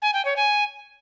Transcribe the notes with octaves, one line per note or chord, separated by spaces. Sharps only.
G#5
G5
C#5
G#5